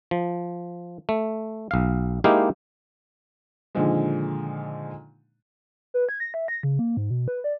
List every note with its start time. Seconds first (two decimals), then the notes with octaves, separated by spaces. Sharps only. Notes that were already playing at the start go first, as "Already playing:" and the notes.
0.11 F3
1.09 A3
1.71 B1 F5
2.24 G#3 A#3 D#4 E4 G4 F5
3.75 A#2 D3 D#3 F3 G#3
5.94 B4
6.09 G#6
6.20 A#6
6.34 E5
6.48 A#6
6.63 C#3
6.79 A#3
6.97 G#2
7.10 B2
7.28 B4
7.44 D5